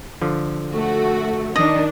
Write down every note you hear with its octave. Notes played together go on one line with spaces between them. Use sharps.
D3 F3
A3 F#4
D#3 D4 D#5